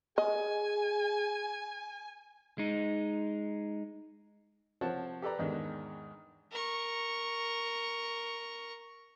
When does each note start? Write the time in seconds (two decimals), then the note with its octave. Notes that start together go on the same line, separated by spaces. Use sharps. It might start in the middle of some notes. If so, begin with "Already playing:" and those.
0.18 G#4 D#5 G#5
2.58 G#3 D#4
4.81 C3 F3 C5 C#5 F#5 A5
5.22 G4 A4 B4 D5 A#5
5.38 E2 G#2 D#3 D4
6.51 A#4 C#6